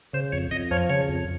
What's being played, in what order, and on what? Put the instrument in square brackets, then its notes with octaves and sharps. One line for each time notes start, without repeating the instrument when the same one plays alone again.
[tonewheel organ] C#3 C5
F2 C#5
F2 D#5
F3 C#5
C#3 C#5
F2